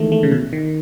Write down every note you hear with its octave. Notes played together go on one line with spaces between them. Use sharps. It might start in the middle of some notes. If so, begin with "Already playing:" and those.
Already playing: D#3 E3 G#3 A3
A3
C#3
B2
D#3